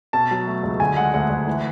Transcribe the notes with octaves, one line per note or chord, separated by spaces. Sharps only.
B2 A5
F#3
A3
C#2
D3 G#5
G#3 F#5
D2 F#5
D2
E3